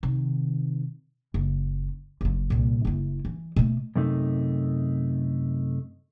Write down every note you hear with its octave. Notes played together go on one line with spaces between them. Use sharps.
C3 D#3
F#1
F#1 F#2
C2 A#2
F#1 E4
E3
B2 A3
F#2 C3 A3 D#4